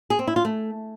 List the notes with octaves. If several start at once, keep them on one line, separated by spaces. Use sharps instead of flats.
G#4
C4
E4
F4
A3